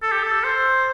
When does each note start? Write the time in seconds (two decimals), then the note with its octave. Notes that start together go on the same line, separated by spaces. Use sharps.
0.02 A4
0.12 G4
0.24 A4
0.44 C5